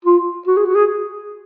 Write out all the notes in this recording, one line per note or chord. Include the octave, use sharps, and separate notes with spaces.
F4
F#4
G#4
F#4
G#4